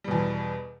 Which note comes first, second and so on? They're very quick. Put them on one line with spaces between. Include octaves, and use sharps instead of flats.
G3 B2 E2